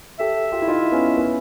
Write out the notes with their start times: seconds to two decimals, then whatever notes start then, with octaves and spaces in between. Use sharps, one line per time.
0.20 G4 A4 E5
0.52 F4 G4
0.62 E4
0.68 D#4 F4
0.92 B3 C#4
1.17 B3 C#4